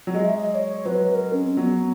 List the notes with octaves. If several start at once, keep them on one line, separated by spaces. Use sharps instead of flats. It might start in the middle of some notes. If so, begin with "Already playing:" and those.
F#3
G#3 D#5
E5
D#5
D#5
C#5
F#3 B4
B4
A#4
C#4
C#4
F#3 B3